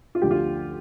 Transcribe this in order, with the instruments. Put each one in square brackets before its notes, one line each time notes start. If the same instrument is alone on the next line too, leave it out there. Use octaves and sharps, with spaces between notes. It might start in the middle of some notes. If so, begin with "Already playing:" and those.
[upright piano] F4
D2 D3 F3 G4
F4